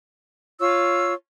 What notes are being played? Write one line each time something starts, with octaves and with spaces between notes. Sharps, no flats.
F4 C#5 C#6 E6